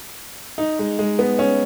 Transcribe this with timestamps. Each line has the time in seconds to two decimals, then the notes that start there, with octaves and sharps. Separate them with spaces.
0.58 D#4
0.79 G#3
0.99 G#3
1.19 B3
1.39 C#4